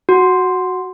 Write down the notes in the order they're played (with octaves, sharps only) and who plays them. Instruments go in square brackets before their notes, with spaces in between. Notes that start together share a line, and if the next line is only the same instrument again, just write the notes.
[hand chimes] F#4